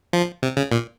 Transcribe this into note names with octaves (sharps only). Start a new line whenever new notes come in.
F3
C3
C#3
A#2